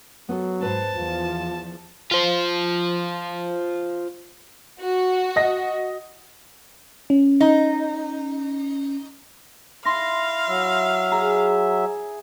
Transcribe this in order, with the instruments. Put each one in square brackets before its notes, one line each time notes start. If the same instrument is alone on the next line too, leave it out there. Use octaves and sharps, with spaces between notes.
[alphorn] F#3 [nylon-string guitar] B3 A4
[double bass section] G#2 [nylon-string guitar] B4 C5 [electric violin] A5
[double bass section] E2 F3 [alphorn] F4
[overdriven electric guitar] F4 C5
[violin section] F#4
[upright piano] D#5 A#6
[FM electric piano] C#4
[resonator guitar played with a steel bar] D#4
[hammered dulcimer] E4 [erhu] F5 [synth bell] C6 A#6
[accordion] F#3 E5
[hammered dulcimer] G#4 [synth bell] A#5